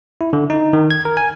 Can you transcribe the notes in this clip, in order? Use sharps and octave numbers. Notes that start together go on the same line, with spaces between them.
E4
D3
D#4
D#3
G#6
A#4
G#5